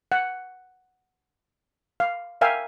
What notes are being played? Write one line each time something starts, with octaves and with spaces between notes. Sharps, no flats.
F#5
F5
A#4 E5 F5 G5 G#5